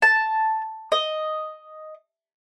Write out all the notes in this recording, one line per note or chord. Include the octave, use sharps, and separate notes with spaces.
A5
D#5